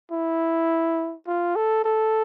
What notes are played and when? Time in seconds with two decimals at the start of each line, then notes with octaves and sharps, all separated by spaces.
0.11 E4
1.27 F4
1.56 A4
1.84 A4